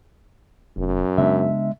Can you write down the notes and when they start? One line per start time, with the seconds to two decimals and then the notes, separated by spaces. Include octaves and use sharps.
0.77 F1 F#2
1.18 C#3 G#3 B3 D4 E5